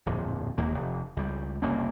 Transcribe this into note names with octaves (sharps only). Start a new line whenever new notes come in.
D1 F2 A#2 F3
E1 D#2 A#3
F1
C#2 G3
F#1 C2 A#3 C#4